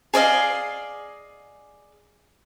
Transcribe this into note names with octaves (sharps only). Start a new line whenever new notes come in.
G#4 D5 D#5 F5